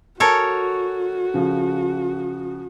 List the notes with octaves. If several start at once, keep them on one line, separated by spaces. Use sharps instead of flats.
F#4 A4 A#4 C#5 G#5 C#6
C#3 F3